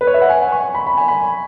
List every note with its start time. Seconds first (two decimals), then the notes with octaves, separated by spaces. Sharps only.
0.01 B4
0.07 C#5
0.14 E5
0.22 F#5
0.29 G#5
0.52 C#6
0.75 B5
0.86 B5
0.97 G#5
1.08 B5